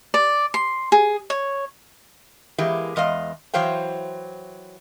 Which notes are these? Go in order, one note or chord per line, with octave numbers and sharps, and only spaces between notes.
D5
C6
G#4
C#5
E3 G#3 A#3 G4
E2 G#3 D#5 F5
E3 F#3 C5 F5 G5